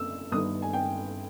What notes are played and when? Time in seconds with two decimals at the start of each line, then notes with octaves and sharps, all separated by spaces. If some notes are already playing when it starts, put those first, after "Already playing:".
Already playing: F#1 F#2 D3 E6
0.32 G1 G2 D#3 D#6
0.62 G#5
0.73 G5